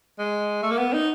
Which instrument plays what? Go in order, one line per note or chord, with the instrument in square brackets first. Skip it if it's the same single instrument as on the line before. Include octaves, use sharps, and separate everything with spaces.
[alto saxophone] G#3
A3
A#3
B3
D#4